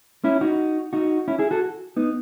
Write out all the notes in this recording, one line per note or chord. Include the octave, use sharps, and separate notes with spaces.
C#4 E4
D#4 F#4
D#4 F#4
C#4 E4
E4 G#4
F#4 A4
B3 D#4